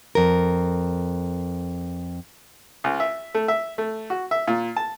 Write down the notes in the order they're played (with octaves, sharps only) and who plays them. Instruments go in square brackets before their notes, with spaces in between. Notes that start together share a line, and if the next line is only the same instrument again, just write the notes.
[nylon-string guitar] F2 A#4
[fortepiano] C#2
E5
A3
E5
A3
F#4
E5
A#2
A5